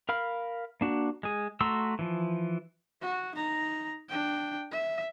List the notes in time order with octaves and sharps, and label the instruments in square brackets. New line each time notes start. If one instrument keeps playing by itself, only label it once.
[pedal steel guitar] A#4 F5 B5 F6
A#3 D4 F#4
G#3 G#4
A3 F#4 A#5 C6 E6
E3 F3
[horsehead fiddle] F#4
D#4 A#5
D4 G5
E5